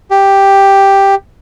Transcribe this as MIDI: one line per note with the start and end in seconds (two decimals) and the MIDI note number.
0.10 1.15 67